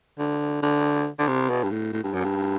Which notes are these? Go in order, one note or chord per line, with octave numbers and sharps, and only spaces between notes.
D3
D3
D3
C3
B2
G2
A2
A2
G2
F#2
G2